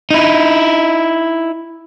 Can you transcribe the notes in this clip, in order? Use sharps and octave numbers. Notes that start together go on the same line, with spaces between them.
D#4 E4